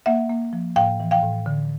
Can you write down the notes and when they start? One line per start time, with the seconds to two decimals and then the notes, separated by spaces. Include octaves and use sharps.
0.06 A#3 E5 F#5
0.30 A#3
0.53 F3
0.76 A2 F5 G5
1.00 E3
1.11 F5 G5
1.23 A2
1.46 D3